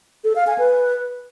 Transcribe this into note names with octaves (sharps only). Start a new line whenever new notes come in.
A4
F5
G#5
B4